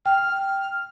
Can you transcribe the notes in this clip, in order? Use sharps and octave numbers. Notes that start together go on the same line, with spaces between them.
G5 F6